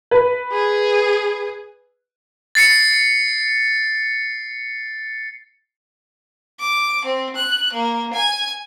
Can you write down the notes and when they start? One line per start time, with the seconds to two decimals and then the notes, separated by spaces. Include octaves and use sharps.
0.11 B4
0.52 G#4
2.55 A6 C7 C#7
6.60 D6
7.05 C4
7.36 F#6
7.72 A#3
8.13 G#5